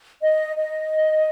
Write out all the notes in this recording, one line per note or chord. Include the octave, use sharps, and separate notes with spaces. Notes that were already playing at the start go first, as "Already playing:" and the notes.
D#5
D#5